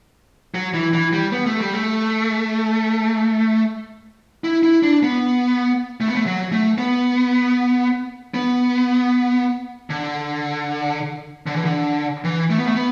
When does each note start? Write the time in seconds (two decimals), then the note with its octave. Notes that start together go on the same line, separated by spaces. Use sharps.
0.54 F#3
0.74 E3
0.93 E3
1.13 G3
1.32 B3
1.46 A3
1.60 G3
1.74 A3
4.44 E4
4.63 E4
4.83 D4
5.03 B3
6.00 A3
6.08 B3
6.15 A3
6.26 F#3
6.52 A3
6.78 B3
8.34 B3
9.90 D3
11.46 D3
11.56 E3
11.65 D3
12.24 E3
12.50 A3
12.58 B3
12.66 A3
12.76 B3